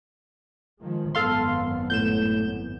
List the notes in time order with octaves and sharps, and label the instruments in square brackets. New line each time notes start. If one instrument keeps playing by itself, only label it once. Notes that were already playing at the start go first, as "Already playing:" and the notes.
[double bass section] D#3 F3 G#3
[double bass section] G#1 F#2 B3 [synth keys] A4 F5 C6
[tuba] A2 [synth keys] G6 E7